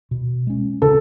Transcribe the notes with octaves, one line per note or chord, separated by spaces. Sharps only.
B2
G#3 C#4
C#3 A4